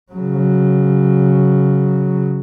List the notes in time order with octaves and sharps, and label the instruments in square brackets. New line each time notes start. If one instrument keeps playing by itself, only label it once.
[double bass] C#3 F#3